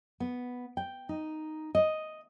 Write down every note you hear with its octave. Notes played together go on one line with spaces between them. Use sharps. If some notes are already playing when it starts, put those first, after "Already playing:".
B3
G5
D#4
D#5